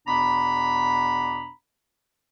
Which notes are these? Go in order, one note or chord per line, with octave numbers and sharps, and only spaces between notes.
E2 B2 B3 D4 A#5 B5